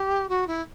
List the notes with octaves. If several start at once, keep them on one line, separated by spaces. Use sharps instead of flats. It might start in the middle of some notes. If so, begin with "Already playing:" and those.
Already playing: G4
F#4
E4